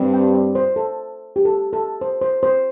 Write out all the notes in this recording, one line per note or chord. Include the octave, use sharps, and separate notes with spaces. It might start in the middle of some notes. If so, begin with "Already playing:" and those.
Already playing: G2 G3 C4
G5
D5
C5
A4
G4
A4
A4
C5
C5
C5